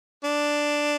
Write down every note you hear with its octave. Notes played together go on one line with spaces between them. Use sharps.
D4